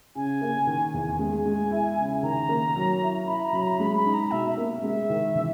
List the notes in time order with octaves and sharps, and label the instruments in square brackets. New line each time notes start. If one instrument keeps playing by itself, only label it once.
[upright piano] C#3 [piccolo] G#5
[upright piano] A#3
D#3
E2
[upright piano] G#3 [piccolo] G#5
[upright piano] G#3
E4
C#3
[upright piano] D#3 [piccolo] A#5
[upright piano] A#3
F#3
E4
[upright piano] E4 [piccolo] B5
[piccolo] A#5
[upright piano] F#3 [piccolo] B5
[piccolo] A#5
[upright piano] G#3 [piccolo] B5
[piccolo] B5
[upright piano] D#4
[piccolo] A#5
[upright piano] B2 [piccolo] E5
[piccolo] E5
[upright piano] A#3
[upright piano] G#3 [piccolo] E5
[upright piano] D#3
E3